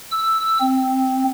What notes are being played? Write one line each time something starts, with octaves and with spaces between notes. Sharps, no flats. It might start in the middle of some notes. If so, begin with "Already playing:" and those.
E6
C4